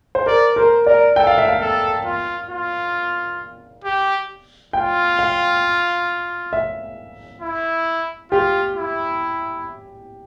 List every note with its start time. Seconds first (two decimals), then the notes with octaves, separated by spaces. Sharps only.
0.15 C5
0.26 A#4 D5
0.56 A#4 C5
0.86 A#4 D5
1.16 A4 G5
1.27 F5
1.38 E5
1.48 F5
1.60 A4
2.05 F4
2.50 F4
3.84 G4
4.73 F4 G5
5.19 F5
6.53 E5
7.42 E4
8.31 F4 G4
8.77 E4